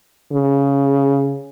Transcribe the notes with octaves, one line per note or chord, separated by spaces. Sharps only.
C#3